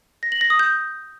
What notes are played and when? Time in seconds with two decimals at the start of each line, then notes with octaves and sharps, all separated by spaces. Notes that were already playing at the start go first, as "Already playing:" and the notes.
0.23 A#6
0.32 F#7
0.41 A#6
0.50 D#6
0.59 G6